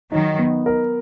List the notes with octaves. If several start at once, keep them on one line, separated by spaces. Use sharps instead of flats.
D#3 F#3 D#4
B3
A#4